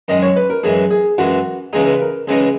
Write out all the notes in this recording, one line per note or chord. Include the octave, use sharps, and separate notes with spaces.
F#2 D#3 G#3 D#5
C#5
B4
A#4
F#2 E3 G#3 G#4
G#4
F#2 E3 G#3 F#4
C#2 C#3 E3 G#3 D#4 G#4
B4
A#4
C#2 C#3 E3 G#3 D#4 G#4